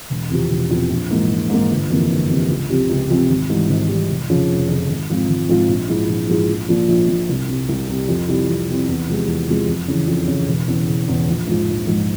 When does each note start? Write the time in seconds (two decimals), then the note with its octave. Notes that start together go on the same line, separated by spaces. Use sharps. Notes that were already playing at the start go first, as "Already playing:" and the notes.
0.10 E1
0.30 E2 C3 F3 C4
0.50 E1
0.70 E2 C3 F3 C4
0.90 A#1
1.10 G#2 E3 A#3
1.30 A#1
1.49 G#2 E3 A#3
1.70 G1
1.90 F2 C3 E3 A#3
2.10 G1
2.30 F2 C3 E3 A#3
2.50 C#2
2.69 C3 F3 C4 G4
2.89 C#2
3.10 C3 F3 C4 G4
3.29 G#1
3.49 G#2 E3 G3
3.69 G#1
3.89 G#2 E3 G3
4.09 F1
4.29 F2 C#3 F3
4.49 F1
4.69 F2 C#3 F3
4.88 G#1
5.09 G#2 F3 C4 F4
5.29 G#1
5.49 G#2 F3 C4 F4
5.69 A#1
5.89 G#2 F3 G#3 E4
6.09 A#1
6.29 G#2 F3 G#3 E4
6.49 A#1
6.69 A#2 F3
6.88 A#1
7.08 A#2 F3
7.29 C2
7.49 C3 G3
7.69 C2
7.88 C3 G3
8.08 F2
8.28 C3 G3 C4 E4
8.48 F2
8.68 C3 G3 C4 E4
8.88 E2
9.08 C3 F3 G#3
9.27 E2
9.48 C3 F3 G#3
9.68 F2
9.88 C#3 E3
10.08 F2
10.28 C#3 E3
10.48 E1
10.67 E2 C#3 E3
10.88 E1
11.08 E2 C#3 E3
11.28 A#1
11.47 G#2 F3
11.68 A#1
11.87 G#2 F3